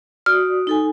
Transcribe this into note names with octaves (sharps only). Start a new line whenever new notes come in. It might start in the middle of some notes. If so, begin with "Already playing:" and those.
F#4 D5 D#6 F6
D#4 A4 G#5